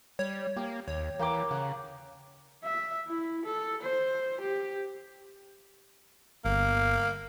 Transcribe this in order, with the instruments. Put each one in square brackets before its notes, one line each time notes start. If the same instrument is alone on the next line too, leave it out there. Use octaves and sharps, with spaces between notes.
[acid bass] G3 [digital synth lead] C#5
[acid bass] A#3 [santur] G4
[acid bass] D#2 [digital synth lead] C#5
[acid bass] E3 [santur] A#3 G5 D6
[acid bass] C#3 [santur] F#5
[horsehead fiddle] E5
E4
A4
C5
G4
[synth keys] G1 [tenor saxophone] A#3